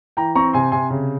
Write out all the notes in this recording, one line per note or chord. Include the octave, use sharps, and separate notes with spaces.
E3 G5 A#5
C4 A#5 C#6
C3 G#5 C6
C3 G#5 C6
C#3